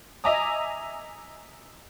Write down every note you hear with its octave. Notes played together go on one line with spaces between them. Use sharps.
D#5 E5 G#5 A#5 D6 D#6